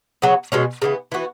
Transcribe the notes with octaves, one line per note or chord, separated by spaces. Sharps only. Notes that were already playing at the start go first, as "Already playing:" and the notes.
C#3 F#3 B3
B2 G#3 C#4
C#3 E3 B3
E3 B3 F#4